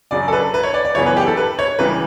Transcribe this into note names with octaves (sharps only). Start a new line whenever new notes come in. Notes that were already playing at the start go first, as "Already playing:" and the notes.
F#2 C#3 F#3 D5
A4
B4
B4
C#5
D5
D5
F#2 C#3 E3 B3 C#5
B4
G4
A4
B4
C#5
C#2 C#3 E3 G3 B4